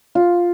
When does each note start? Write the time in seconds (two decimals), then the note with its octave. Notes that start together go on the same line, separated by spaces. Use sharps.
0.15 F4